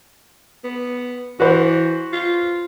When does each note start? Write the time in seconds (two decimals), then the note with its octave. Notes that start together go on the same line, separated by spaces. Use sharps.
0.64 B3
1.40 E3 F#4 B4 C5
2.13 F4